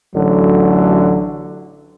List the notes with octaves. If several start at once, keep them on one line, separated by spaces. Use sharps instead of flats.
A1 D3 F#3